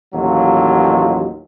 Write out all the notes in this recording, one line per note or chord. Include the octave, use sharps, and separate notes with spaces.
A1 D#2 F#3 F4